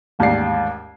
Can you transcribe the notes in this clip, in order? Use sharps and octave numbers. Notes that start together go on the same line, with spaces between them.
A1 D#2 G#2 G4 D5 C7